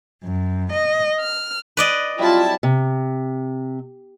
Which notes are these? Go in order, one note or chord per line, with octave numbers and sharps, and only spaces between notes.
F#2
D#5
F6
B4 D5 D#5
C3 F#3 G3 E4 F4 A5
C3